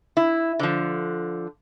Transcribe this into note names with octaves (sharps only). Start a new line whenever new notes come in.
E4
D3 F3